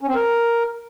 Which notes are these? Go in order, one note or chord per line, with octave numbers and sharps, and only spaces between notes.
C#4
C4
A#4